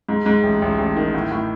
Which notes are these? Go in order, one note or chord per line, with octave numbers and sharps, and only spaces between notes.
G#2
G#2
A1
A1
A1
D#3
A2
A2